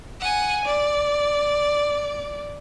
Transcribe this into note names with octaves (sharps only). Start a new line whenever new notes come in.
F#5 G#5
D5